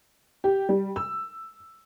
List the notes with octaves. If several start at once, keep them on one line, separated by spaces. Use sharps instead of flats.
G4
G3
E6